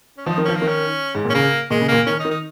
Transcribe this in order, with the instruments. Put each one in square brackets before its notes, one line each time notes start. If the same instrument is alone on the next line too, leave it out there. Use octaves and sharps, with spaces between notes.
[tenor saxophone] C#4
[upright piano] F3 [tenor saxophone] D#4
[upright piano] D#3
[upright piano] F3 [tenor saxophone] C#4
[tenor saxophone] A#3
[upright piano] D#3
[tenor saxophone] C#4
[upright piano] G#2
[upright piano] A#2 [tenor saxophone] C#4
[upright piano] C#3 [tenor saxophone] A#3
[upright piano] A#2 [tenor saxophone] G#3
[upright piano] C#3
[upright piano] A#2 [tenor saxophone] A#3
[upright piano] D#3 [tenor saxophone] C#4
[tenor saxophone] D#4
[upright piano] D#3
[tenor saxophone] D#4